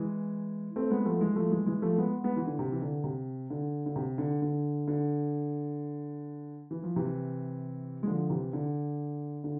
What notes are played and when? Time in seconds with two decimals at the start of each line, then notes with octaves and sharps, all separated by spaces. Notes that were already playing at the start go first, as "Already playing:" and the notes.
Already playing: E3 G#3
0.76 A3 C4
0.91 G#3 B3
1.05 F3 A3
1.21 E3 G#3
1.36 F3 A3
1.51 E3 G#3
1.66 E3 G#3
1.82 F3 A3
1.98 G#3 B3
2.24 G#3 B3
2.37 E3
2.46 D3
2.59 C3
2.72 E3
2.82 D3
3.04 C3
3.50 D3
3.86 D3
3.96 C3
4.18 D3
4.42 D3
4.88 D3
6.71 E3
6.83 F3
6.96 C3 E3
8.03 G#3
8.07 D3 F3
8.29 C3 E3
8.53 D3
9.44 D3